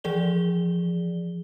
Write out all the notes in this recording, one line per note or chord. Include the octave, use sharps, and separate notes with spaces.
E3 F3 G#4 D5 G7